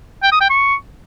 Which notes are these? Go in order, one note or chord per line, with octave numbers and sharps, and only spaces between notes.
G5
D#6
G5
C#6